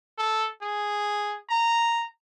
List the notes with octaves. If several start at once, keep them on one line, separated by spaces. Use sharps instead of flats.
A4
G#4
A#5